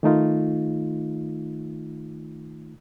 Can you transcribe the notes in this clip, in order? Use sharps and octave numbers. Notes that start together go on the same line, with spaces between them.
D#3 A3 D#4 F4